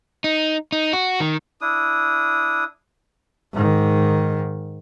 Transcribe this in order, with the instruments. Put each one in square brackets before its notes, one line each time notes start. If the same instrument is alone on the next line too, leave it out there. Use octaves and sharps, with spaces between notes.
[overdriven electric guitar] D#4
D#4
F#4
D#3
[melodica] D4 E4 D#6
[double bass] G#2 D#3